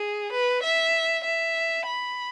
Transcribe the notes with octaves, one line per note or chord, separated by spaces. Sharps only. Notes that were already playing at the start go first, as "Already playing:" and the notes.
Already playing: G#4
B4
E5
E5
B5